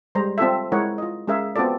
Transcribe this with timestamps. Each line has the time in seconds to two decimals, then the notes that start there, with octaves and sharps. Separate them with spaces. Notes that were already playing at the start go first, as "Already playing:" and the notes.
0.15 G3 G#3 C5 A#5
0.38 C4 F4 A4 E5
0.72 G#3 E4 A#4 C#5 F#5
0.98 F4 D#5
1.28 G#3 C#4 G#4 A#4 E5 F5
1.56 B3 C4 F4 F#4 A4 D5